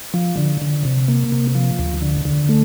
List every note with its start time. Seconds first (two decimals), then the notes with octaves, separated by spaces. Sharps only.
0.14 F3
0.37 D3
0.61 D3
0.85 C3
1.08 A#3
1.32 C3
1.55 F3
1.79 D2
2.02 D3
2.25 D3
2.49 A3